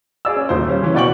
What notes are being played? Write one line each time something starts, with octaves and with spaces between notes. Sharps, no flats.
G#4 D5 E6
C#4
D#1 C5
G3 C#4
C#3 E3 C#4
B2 B4 D5 G5 C#6 F#7